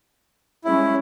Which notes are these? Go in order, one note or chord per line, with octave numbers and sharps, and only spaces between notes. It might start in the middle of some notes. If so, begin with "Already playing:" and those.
G3 G#3 C#4 E4